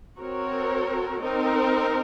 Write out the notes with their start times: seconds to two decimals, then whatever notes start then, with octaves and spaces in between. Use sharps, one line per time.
0.19 C4 F#4 A#4 C#5
1.21 C4 D#4 A#4